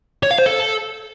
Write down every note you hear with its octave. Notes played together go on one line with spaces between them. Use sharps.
C#5
F5
C5
A4